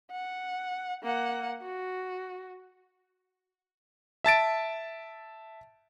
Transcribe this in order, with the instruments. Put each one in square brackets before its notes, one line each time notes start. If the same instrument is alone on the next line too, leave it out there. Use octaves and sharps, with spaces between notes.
[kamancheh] F#5
A#3 F#5
F#4
[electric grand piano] E5 A5 A6 D7